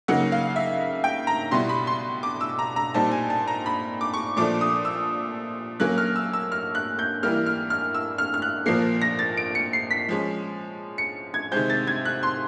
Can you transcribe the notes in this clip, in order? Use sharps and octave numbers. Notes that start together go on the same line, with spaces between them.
C#3 F#3 A#3 D#4 F#5
F5
E5
G5
A#5
B2 G3 B3 E4 C6
B5
C6
D6
E6
A#5
A#5
A#2 G3 C4 D#4 A5
G#5
A5
A#5
B5
D6
C#6
A#2 F3 A3 D4 D6
D#6
E6
F#3 A#3 C#4 F#6
F6
E6
E6
F6
F#6
G6
E3 G3 A#3 F6
F6
F6
E6
F6
F6
F#6
A#2 F3 A#3 C7
A#6
A6
D7
C#7
C7
B6
F3 G#3 C#4
C#7
G#6
C3 D#3 G#3 C4 G6
A6
G#6
F#6
C6